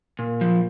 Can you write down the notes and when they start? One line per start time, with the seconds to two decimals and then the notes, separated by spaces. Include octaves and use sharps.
0.19 A#2
0.41 F3